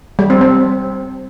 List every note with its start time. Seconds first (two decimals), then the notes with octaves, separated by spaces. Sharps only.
0.19 G3
0.30 C4
0.41 C4